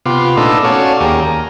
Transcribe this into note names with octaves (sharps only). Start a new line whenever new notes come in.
C3 B3 F4 C6 D6
A#2 A3 B3 D4 D#4 A4
C#4 F#4 C#5 D5 F5 A5
D#2 A#3 G4 G#4
A#5